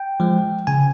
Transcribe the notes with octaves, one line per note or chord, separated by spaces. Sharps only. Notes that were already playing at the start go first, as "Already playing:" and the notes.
Already playing: G5
F3 G#3
C#3 G#5